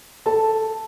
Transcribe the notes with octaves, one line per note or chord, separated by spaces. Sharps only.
A4 A5